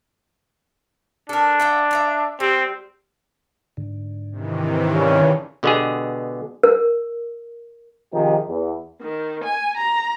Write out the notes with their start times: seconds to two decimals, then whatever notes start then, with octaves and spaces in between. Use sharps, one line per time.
1.29 D4 A4 A#4
1.60 E5 F#5 G5
1.91 E5 F#5 A#5
2.40 G3 C4
3.77 G#2 D3
4.32 C3 D#3 E3
4.95 G2 C#3 C#4
5.63 B2 D3 G#3 B3 G4 G#4
6.63 A#4
8.13 C3 D#3 F3 D#4 G4 G#4
8.47 E2
9.01 D#3
9.43 G#5
9.77 A#5